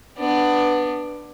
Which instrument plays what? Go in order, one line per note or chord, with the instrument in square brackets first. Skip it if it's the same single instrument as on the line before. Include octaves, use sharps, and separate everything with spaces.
[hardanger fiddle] B3 D4